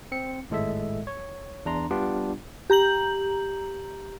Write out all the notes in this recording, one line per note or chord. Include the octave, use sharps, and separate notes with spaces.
C4 C#7
G#1 A2 G#3 A4 E5
C#5
E2 D4 A#5 C6
G3 B3 D4 F4 G4
G4 A#5 G6 F#7